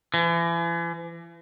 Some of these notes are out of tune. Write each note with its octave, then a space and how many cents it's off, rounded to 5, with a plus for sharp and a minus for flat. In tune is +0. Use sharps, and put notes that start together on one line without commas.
E3 +40